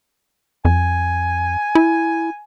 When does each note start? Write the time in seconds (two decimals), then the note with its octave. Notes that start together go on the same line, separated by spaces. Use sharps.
0.65 F2 G#5
1.75 E4